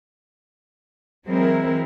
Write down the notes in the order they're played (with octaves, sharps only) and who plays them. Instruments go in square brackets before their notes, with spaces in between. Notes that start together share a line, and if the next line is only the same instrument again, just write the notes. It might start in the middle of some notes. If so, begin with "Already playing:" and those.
[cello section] E3 F#3 G#3 C4 E4 A#4